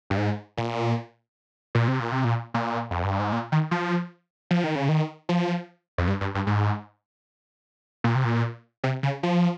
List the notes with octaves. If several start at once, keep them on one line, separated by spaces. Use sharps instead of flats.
G2
G#2
A#2
A#2
C3
A#2
C3
A#2
A#2
F2
G2
G#2
A#2
D#3
F3
F3
D#3
C#3
D#3
F3
F2
G2
G2
G2
G#2
A#2
C3
A#2
C3
C#3
F3